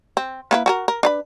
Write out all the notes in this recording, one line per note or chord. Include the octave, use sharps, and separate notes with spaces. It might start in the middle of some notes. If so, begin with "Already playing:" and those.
C4
A#3 E4 B4
F#4 G#4 A#4
A#4
D4 B4 B5